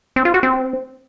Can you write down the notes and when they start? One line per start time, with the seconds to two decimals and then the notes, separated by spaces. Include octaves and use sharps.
0.16 C4
0.25 F4
0.34 F#4
0.43 C4